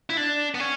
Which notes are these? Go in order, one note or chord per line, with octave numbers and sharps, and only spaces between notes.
E4
D4
B3
C#4